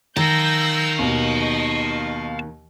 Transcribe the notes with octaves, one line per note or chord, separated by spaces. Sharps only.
D#3 F5 A5 E6 G6 A#6
D#2 B2 D#5 C#6